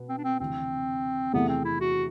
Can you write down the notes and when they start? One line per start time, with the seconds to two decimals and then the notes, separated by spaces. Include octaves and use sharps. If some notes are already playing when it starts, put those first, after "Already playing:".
Already playing: B2 B3
0.09 C4
0.18 D4
0.24 C4
0.40 D2 C3 E3 C4
1.33 E2 C3 E3 A3 B3
1.49 C4
1.65 E4
1.81 F#4